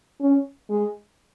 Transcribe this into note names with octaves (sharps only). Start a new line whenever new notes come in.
C#4
G#3